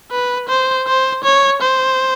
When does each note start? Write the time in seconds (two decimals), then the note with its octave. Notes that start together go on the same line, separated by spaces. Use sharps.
0.11 B4
0.48 C5
0.87 C5
1.24 C#5
1.61 C5